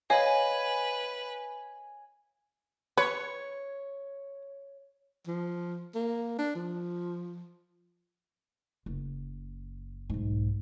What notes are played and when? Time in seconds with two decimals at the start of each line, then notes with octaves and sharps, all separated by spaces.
0.10 B4 C#5 D#5 F5 G#5
2.97 B4 C#5
5.27 F3
5.95 A#3
6.38 D4
6.55 F3
8.86 F#1
10.10 B1 G#2